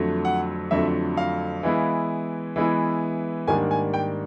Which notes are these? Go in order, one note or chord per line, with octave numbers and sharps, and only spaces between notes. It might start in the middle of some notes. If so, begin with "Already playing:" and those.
Already playing: F2 D3 F#3 A3
F#5
F2 D3 F#3 A3 E5
F5
E3 G#3 B3 E4
E3 G#3 B3 E4
G#2 D#3 G3 A#3 D4 G#5
G#5
G5